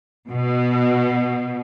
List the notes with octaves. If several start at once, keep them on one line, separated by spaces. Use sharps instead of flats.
B2